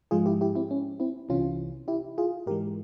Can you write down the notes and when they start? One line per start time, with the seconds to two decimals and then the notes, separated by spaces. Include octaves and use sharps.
0.11 G#2 F3 G#3 F4 G#4
0.26 E4 G4
0.41 E4 G4
0.55 C4 E4
0.71 C#4
1.00 C4 E4
1.29 C2 C3 E3 C#4 F4
1.88 E4 G4
2.18 F4 G#4
2.46 G#2 E3 G#3 G4 A#4